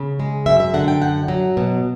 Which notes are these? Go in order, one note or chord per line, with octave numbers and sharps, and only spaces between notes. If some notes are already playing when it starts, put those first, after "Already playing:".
Already playing: C#3
G#3
F#2 E5
E5
D3 F#5
G5
F#2 F#5
F#3
B2